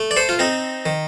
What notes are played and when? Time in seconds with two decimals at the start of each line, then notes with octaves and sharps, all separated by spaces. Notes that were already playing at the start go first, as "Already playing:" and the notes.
Already playing: A3
0.11 D5
0.17 A4 C5
0.29 F4
0.39 C4 D#4
0.86 D#3